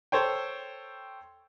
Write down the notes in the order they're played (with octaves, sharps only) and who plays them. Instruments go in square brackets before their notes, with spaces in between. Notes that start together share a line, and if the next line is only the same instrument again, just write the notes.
[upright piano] A4 C5 C#5 G5